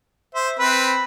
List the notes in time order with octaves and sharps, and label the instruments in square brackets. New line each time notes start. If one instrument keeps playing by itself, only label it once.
[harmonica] C5 [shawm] E5
[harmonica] C4 B4 [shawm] B5